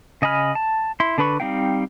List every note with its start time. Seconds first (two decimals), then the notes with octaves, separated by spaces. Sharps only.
0.22 C#3 D#5 G#5 B5 F6
0.55 A5
1.00 E4 C6
1.18 D3 D4 B4 B5 C#6
1.40 G3 C4 D#4 F5 G5